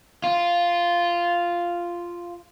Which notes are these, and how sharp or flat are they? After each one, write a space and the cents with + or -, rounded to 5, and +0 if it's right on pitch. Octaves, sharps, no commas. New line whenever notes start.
F4 -5